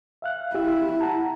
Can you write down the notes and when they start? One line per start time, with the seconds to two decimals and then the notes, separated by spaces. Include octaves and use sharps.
0.22 E5 F5 F#6
0.55 E4 G4 E5
1.01 F#5 A5 A#5